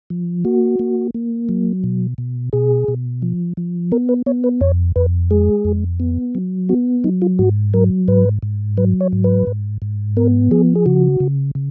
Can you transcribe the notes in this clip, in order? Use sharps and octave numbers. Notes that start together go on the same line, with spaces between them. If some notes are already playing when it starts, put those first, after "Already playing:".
F3
A#3 F#4
A#3
A#3
F#3
B2
B2
B2 G#4
B2
F3
F3
B3 A#4
B4
B3 C#5
B4
F2 C#5
F2 B4
G#3 G#4
F2
B3
F#3
B3 F#4
F#3 D#4
F4
G#2 F#4
F#3 A#4
G#2 B4
G#2
F#3 B4
C#5
G#2
B4
G#2
G#2
B3 A#4
F3 G#4
G#4
C#3 F#4
C#3
C#3